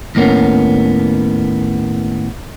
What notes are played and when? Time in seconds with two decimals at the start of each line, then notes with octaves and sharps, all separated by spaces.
0.15 D#2 A2 A#3 B3 C#4